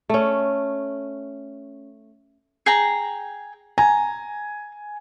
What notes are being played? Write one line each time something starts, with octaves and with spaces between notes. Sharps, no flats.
A3 C#4
G#4 G5 A#5
G#5 A#5